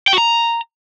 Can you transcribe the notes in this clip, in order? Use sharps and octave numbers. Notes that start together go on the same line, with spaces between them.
G5
F#4
A#5